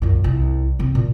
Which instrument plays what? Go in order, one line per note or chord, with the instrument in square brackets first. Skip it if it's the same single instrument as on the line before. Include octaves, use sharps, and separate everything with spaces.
[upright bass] F#2 A#2
C2
C3 C4
A#2